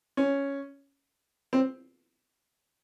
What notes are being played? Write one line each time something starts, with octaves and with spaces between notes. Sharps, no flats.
C#4
C4